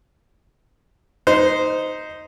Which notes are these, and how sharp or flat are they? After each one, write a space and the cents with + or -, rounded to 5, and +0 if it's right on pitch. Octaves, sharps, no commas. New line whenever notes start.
D#4 +0 C5 -10